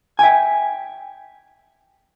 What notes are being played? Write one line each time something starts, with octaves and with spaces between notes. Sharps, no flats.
E5 G5 G#5